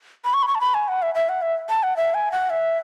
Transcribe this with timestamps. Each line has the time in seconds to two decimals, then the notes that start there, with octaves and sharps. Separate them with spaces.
0.25 B5
0.34 C#6
0.43 B5
0.48 C#6
0.55 A5
0.61 B5
0.74 G#5
0.88 F#5
1.02 E5
1.15 E5
1.29 F#5
1.42 E5
1.69 A5
1.83 F#5
1.97 E5
2.14 G#5
2.32 F#5
2.50 E5